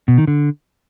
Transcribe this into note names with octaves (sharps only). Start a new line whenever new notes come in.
B2
D#3
D3